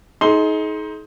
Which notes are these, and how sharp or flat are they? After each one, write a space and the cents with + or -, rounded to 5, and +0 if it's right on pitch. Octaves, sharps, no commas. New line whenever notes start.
D#4 +25 G#4 +40 C6 +5